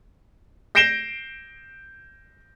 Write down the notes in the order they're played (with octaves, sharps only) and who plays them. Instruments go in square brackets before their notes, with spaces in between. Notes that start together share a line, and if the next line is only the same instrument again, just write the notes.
[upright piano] G6 A#6 C7 D7 E7 G7